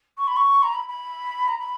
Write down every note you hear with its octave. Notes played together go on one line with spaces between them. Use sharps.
C#6
B5
C#6
A#5
B5
B5
A#5
B5